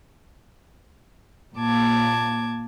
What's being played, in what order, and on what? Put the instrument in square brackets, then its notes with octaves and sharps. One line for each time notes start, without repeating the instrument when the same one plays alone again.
[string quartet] A#2 A#3 A5 D6 G#6